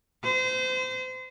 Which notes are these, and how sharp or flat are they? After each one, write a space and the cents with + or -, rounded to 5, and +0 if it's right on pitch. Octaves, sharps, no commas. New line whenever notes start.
C5 -30